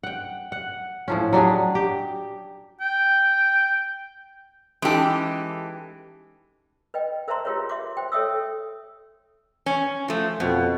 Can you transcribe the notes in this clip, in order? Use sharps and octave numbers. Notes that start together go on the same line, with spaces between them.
F#5 G5
F#5
A2 F3 C#4
F#3 D4 G4 G#4
G4
G5
E3 G#3 C#4 D#4 G4 A4
B4 D#5 G5
A#4 C5 E5 A5 A#5 C6
F4 G4 G#4 A#4 B4 C#5
E5 C6 D6
C5 G5
A4 C#5 E5 G5 D#6 E6
C#4
F3 A3
F2 B2